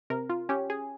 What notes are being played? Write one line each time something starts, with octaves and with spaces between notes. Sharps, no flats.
C3 A#4
F4
C#4 G4
G#4